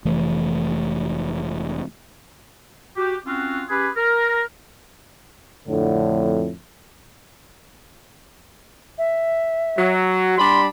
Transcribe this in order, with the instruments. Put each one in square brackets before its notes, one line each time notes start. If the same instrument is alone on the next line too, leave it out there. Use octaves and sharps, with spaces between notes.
[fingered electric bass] F1 E3 A3
[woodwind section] F#4 G4
C4 C#4 F4 F#4
C#4 G4 G#4 B4 B5
A#4
[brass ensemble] F2 A2 D3
[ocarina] E5
[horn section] F#3
[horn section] G3 D4 B5 [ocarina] C6